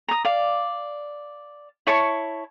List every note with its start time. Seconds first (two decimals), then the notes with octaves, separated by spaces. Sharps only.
0.08 A#5 D#6
0.25 D5 F5
1.87 E4 C#5 A5 C#6